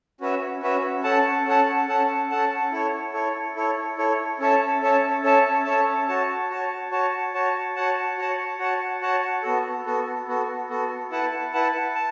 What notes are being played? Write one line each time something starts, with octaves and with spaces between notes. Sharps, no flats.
C#4 F#4 B4 E5
C#4 F#4 B4 E5
C#4 A4 F#5 A5
C#4 A4 F#5 A5
C#4 A4 F#5 A5
C#4 A4 F#5 A5
E4 A4 C#5
E4 A4 C#5
E4 A4 C#5
E4 A4 C#5
C#4 A4 C#5 E5 A5
C#4 A4 C#5 E5 A5
C#4 A4 C#5 E5 A5
C#4 A4 C#5 E5 A5
F#4 C#5 A5
F#4 C#5 A5
F#4 C#5 A5
F#4 C#5 A5
F#4 C#5 F#5 A5
F#4 C#5 F#5 A5
F#4 C#5 F#5 A5
F#4 C#5 F#5 A5
B3 F#4 A4
B3 F#4 A4
B3 F#4 A4
B3 F#4 A4
E4 B4 F#5 A5
E4 B4 F#5 A5
A5